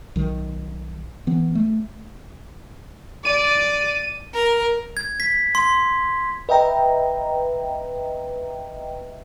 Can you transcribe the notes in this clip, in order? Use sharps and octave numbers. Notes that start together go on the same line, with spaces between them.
B1 D#3
E3 B3
A3
D5 D#7
A#4
G#6
B6
C6
B4 D#5 E5 G5 A#5